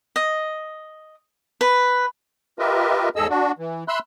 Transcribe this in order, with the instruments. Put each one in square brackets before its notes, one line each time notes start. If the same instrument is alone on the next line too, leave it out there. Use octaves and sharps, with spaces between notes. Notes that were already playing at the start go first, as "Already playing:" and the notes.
[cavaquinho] D#5
B4
[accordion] F4 G4 A#4 B4 D#5 E5
E2 G#2 G#4 A4 D#5 E6
D4 F#4
E3
E5 B5 C6 E6 F#6